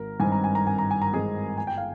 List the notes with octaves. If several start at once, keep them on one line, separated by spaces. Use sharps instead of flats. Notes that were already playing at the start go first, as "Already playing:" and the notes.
Already playing: G#1 A#4
G2 D#3 G#3 C4 G#5
A#5
G#5
A#5
G#1 G#5
A#5
G#5
A#5
G2 D#3 G#3 C4 G#4 G#5
G1 G#5
G5
F5